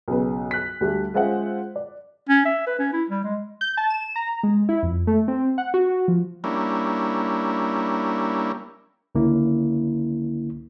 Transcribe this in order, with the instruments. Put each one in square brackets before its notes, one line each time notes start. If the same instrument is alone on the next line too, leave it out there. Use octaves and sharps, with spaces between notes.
[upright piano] B1 C#3 B4
F#6 B6
D2 G3 A3
G#3 C#4 F4 C5 E5 F#5
D5
[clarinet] C#4
E5
B4
C#4
E4
G3
G#3
[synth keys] G6
A5
E7
A#5
G#3
E4
F2
A3
C4
F#5
F#4
F3
[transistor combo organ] G3 A#3 C#4 D4 E4
[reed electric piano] C#2 D3 A#3 C#4 E4